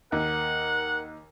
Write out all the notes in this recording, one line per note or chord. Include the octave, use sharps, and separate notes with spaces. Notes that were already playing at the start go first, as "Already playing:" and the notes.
D#2 A#4 F#5